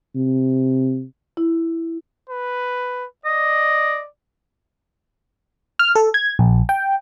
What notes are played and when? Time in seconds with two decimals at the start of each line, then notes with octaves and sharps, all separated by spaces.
0.15 C3
1.37 E4
2.30 B4
3.25 D5 D#5
5.79 F6
5.95 A4
6.14 G#6
6.39 A#1
6.69 G5